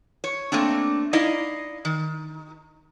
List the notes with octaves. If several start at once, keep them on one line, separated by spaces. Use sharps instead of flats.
C#5
A3 A#3 C4 D4
D#4 E4 D5 D#5 F5
D#3